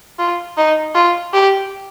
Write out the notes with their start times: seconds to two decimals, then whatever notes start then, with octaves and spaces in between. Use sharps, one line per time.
0.19 F4
0.58 D#4
0.95 F4
1.33 G4